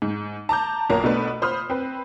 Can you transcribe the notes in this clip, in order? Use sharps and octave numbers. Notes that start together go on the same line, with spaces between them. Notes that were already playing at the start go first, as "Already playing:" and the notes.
G#2
A5 A#5 D6 G6
B1 A#3 F4 A#4 C#5 A#5
B2 A3 D4 B4 B5
F4 C5 B5 D#6 F6
C4 B4